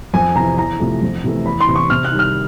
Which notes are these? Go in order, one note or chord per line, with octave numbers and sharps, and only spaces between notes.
F2 G#5
C3 E3 A#5
E2 A#5
C3 F3 A3
F2
C3 E3 A3
E2 B5
C6
C3 E3
C#6
C3 F6
F#6
D#3 G3
F6